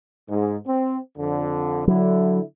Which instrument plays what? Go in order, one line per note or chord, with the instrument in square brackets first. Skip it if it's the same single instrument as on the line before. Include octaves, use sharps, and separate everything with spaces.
[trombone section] G#2
C4
F2 D3
[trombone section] D3 E4 [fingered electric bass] F#3